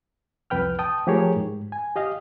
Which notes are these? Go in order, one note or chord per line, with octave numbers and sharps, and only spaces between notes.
C2 F2 B4 G5 F6
G5 A5 D#6
F3 A3 G4 G#4 A#4 C#5
G#2
G#5
G4 D#5 F5